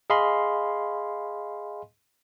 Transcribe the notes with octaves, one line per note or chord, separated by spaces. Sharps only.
G#4 D#5 F5 G#5 B5 C6